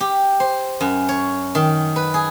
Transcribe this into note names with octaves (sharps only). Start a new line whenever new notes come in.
G4
C5
F#2
C#5
D#3
B4
G#4